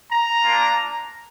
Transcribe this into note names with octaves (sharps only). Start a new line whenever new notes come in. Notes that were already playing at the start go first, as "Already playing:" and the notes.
A#5
A#3 D4 F4